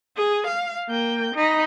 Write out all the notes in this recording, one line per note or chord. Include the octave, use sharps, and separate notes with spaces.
G#4
F5
A#3 G5
D#4 B5